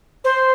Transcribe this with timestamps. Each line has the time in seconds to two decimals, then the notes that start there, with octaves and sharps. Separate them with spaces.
0.24 C5